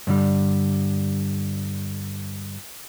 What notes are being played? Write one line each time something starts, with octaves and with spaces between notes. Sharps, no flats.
G2 D3 G3